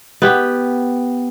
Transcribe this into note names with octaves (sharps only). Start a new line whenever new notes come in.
B3 G4